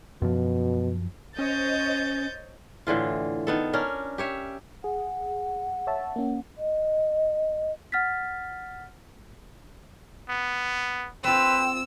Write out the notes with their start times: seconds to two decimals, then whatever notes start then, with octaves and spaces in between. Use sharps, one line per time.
0.22 F#2 B2 F3
1.39 C#4 C5 C#5 D#5 G6 A6
2.87 A2 D3 E3 F4
3.47 D#3 B3 A4
3.73 C#4 D4 A#4
4.18 G4 C#5 E5
4.84 G#4 F#5
5.87 C#5 E5 A5
6.16 A#3 C#4
6.58 D#5
7.92 F#5 F6 A6 B6
10.29 B3
11.24 C4 F4 B4 G5 E6